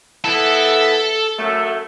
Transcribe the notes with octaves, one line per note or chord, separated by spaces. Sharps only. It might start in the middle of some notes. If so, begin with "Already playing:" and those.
E3 B3 E4 A4 A5
F#2 A3